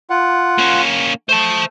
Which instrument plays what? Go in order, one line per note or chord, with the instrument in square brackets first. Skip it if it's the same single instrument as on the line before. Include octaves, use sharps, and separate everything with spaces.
[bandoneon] F4 F#5
[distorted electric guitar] A#3 C#4
[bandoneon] A3 [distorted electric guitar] C5 A5